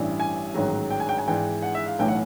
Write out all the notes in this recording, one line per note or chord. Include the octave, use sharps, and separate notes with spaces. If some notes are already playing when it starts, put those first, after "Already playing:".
Already playing: A1 G2 E3 G3
G#5
A1 G#2 D#3 F#3
G5
G#5
G5
G#5
G#1 G#2 E3 G5
F#5
E5
F5
B1 A2 E3 A3 G5
F#5